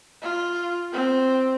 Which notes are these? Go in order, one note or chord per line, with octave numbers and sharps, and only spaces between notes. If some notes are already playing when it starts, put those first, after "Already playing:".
F4
C4